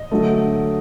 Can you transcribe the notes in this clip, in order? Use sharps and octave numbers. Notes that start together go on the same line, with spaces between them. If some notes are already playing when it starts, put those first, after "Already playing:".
Already playing: D#5
D3 F#3 A3